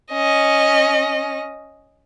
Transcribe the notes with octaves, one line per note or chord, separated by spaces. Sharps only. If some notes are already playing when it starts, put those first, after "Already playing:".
C#4 D#5